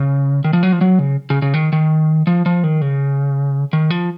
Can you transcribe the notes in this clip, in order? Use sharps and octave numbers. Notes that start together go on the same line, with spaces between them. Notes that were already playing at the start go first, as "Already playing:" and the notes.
Already playing: C#3
D#3
F3
F#3
F3
F#3
C#3
C#3
C#3
D#3
D#3
F3
F3
D#3
C#3
D#3
F3